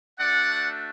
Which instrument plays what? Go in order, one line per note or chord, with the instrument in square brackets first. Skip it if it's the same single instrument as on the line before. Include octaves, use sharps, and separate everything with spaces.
[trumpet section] A3 D4 F#4 D5 F#5